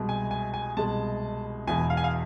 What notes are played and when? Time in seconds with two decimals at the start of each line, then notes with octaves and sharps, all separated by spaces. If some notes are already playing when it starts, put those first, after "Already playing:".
Already playing: C2 B2 G#3
0.09 G#5
0.31 G#5
0.54 G#5
0.77 C2 B2 G#3 A5
1.67 E1 E2 B2 G#5
1.90 F5
1.97 G#5
2.04 F5